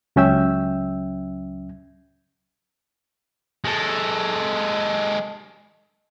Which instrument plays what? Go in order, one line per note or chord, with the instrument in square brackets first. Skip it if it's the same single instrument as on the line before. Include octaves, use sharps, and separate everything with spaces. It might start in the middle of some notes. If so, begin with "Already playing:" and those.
[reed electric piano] C#2 F#3 C#4 E5 G5 E6
[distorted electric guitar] G#3 A4